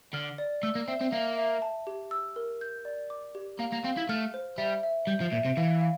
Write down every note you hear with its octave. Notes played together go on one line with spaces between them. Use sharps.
D3 F6
D5
A3 E6
A#3
C4 E5
C4
A#3 E5
E5
A5
G4
E6
A#4
G6
D5
D6
G4
A#3 F5
A#3
C4 F5
E4
A3 F6
C5
G3 E5
E5
G3 G6
F3
A#2 E5
C3
E3 F5
F5